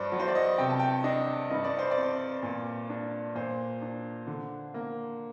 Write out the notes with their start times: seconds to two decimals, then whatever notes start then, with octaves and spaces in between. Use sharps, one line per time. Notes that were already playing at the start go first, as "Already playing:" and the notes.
Already playing: G2 F#3 C5 D5
0.12 F#3
0.19 C5
0.28 D5
0.35 D#5
0.58 C3 G5
0.69 A5
0.79 G5
1.04 D4 D#5
1.50 G2 D#5
1.64 D5
1.79 C5
1.91 D5
1.97 C4
2.43 A#2
2.89 D4
3.35 A#2 C5
3.82 D4
4.27 D3
4.74 A#3